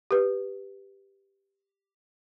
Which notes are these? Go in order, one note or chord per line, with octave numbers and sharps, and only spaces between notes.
G4 B4